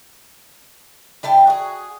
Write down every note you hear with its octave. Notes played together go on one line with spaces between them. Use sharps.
G3 E4 G5 A5
F#4 G#4